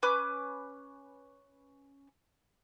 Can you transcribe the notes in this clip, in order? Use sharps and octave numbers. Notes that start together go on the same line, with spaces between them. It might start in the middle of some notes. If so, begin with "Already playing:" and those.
C#4 B4 D6 F6